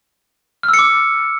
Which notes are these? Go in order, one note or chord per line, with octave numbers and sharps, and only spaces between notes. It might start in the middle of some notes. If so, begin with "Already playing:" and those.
F6
E6
C#7
D6